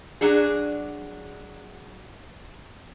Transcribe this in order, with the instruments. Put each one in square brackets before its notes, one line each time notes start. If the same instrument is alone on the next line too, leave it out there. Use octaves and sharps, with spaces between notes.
[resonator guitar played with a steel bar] F#3 D4 G#4